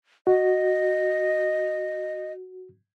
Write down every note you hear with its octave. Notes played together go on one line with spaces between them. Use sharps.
F#4 D#5